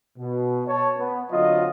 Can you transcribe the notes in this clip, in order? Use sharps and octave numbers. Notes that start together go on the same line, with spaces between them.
B2
C#5 A5
B3
D3 F#3 C4 F4 D#5